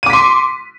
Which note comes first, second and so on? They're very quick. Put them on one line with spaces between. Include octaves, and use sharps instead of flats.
D#7 D6 B6 C6